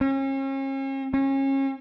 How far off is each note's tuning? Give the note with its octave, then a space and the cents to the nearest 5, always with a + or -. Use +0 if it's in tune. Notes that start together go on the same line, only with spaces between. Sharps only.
C#4 -40
C#4 -35